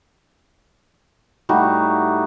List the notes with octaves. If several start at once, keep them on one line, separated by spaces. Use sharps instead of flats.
A2 G3 D#4 F#4